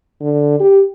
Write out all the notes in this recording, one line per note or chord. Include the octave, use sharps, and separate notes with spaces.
D3
G4